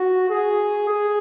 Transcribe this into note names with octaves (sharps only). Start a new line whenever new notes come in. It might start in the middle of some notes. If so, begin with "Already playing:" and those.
Already playing: F#4
G#4
G#4